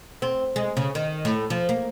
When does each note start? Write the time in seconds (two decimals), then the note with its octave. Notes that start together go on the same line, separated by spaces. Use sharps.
0.22 C4
0.56 G#3
0.77 C#3
0.95 D#3
1.25 A2
1.50 F3
1.69 A#3